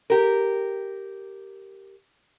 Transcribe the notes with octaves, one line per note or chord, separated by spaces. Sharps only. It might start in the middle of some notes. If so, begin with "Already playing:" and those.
G4 A#4